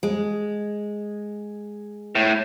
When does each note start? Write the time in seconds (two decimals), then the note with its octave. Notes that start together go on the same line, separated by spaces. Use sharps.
0.03 G#3
2.15 A2